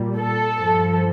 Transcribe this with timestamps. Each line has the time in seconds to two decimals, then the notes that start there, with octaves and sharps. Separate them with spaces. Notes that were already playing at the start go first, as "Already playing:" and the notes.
Already playing: A#2 G3
0.19 A4
0.57 G2 F3